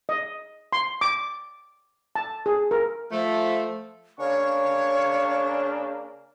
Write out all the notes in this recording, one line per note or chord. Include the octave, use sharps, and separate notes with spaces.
D#5
C6
D6
A5
G#4
A#4
F3 A3
C#3 A#3 D4 C#5 F5 C#6